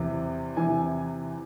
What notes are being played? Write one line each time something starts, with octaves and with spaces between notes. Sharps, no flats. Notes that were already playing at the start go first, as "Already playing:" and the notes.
Already playing: E2 C3 E3
E2 C3 E3 G#5